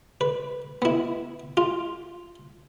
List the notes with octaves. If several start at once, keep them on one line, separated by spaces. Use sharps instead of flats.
B4
B3 E4
F4